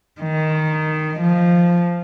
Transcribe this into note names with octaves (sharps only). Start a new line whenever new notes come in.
D#3
F3